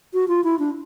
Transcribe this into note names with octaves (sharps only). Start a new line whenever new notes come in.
F#4
F4
E4
D4